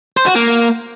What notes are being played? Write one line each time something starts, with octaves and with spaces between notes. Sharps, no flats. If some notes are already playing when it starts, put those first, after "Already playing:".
C5
F#4
A#3